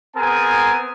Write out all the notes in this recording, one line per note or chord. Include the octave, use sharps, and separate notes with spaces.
B3 C4 G#4 A#4 G#5